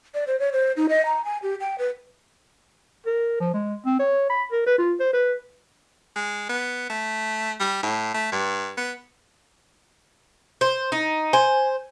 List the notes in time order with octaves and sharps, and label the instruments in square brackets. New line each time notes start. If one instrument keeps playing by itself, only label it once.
[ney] D5
C5
C#5
C5
D#4
D#5
A#5
G#5
G4
G5
B4
[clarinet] A#4
F3
G#3
C4
C#5
B5
A#4
B4
F4
C5
B4
[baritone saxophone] G#3
B3
A3
G3
A2
A3
G2
B3
[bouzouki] C5
D#4
[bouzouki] C5 [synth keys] G#5